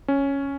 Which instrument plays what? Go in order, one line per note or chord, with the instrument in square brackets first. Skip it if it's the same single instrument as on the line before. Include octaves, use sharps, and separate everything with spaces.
[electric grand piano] C#4